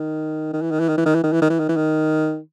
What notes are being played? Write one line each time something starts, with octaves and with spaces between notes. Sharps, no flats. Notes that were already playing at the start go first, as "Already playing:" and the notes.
Already playing: D#3
D#3
E3
D#3
E3
D#3
E3
D#3
E3
D#3
E3
D#3
E3
D#3
E3
D#3